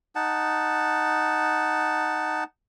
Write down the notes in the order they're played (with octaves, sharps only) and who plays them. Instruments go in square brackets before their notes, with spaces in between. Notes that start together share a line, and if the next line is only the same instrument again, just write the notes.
[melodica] D#4 F#5 A5